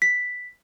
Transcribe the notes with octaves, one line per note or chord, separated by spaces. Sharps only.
B6